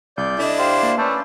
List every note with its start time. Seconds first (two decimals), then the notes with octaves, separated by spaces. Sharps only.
0.18 C2 D5 G6
0.39 D4 E4 A4 D#5
0.59 G4 C5 F5
0.83 A#3
0.98 A3 C#4 B4 D5 A5 G6